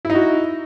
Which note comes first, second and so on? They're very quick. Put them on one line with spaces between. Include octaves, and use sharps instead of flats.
E4 D#4 F#4